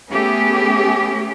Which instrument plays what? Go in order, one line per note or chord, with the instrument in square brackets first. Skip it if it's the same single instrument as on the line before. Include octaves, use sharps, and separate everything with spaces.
[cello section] A3 B3 C#4 G4 G#4